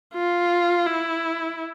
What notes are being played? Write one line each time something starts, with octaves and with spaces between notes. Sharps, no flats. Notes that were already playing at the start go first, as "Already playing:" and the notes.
F4
E4